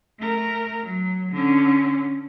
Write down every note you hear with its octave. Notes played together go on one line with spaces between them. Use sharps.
A3 A#4
F#3
D3 C#4